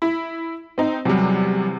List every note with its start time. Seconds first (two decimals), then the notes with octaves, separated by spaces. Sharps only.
0.02 E4
0.78 C4 D#4
1.05 E2 C3 F#3 G3